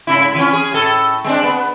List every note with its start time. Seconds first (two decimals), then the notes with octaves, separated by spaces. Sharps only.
0.07 G#2 C#3 E4
0.35 E3 C#4
0.53 G#4
0.72 A2 A4
1.24 G#3 C4 D4
1.43 B3